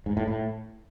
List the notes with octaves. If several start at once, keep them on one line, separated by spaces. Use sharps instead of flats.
G#2
A2
A2